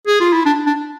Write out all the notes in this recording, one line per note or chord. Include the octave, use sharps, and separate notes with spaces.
G#4
F4
E4
D4
D4